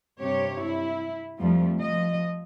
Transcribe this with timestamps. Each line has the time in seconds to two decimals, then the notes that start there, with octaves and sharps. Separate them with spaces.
0.20 G2 C3 G4 C#5
0.63 E4
1.39 F2 F3 G3 A3
1.79 F3 D#5